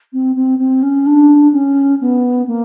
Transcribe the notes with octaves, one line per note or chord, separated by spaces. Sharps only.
C4
C4
C4
C#4
D4
C#4
B3
A#3